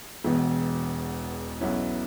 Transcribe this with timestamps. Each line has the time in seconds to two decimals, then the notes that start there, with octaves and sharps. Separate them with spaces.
0.24 E1 E2 B2
1.61 B1 B2 F#3 C#4 E4